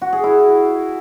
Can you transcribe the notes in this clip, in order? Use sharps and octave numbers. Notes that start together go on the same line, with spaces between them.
F#4
G#4
E4